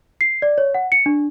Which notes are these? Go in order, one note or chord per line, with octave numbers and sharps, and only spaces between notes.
C7
D5
C#5
F#5
C#7
D4